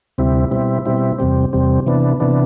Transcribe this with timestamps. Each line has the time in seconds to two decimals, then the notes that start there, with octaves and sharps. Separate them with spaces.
0.18 D2 C3 G3 C4 E4
0.51 B2 G3 C4 E4
0.86 B2 G3 C4 E4
1.19 E2 C3 G3 C4
1.53 E2 C3 G3 C4
1.86 C3 E3 B3 D4
2.20 C3 E3 B3 D4